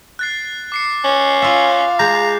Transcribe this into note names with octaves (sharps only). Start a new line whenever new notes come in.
F#6 A6 C7
D6 C7 C#7
C#4
F4 E5 F5 A6
G#3 A#5 G6